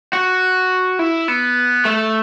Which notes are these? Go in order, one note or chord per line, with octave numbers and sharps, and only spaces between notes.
F#4
E4
B3
A3